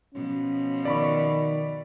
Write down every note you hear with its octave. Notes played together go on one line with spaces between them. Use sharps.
B2 F3 C#4
D#3 D5 B5 C#6